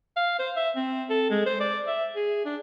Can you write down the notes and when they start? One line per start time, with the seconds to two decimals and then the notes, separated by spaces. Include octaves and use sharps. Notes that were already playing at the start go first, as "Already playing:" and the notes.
0.17 F5
0.39 C5
0.56 E5
0.76 C4
1.10 A4
1.30 G#3
1.46 C5
1.60 D5
1.87 E5
2.16 G#4
2.45 D4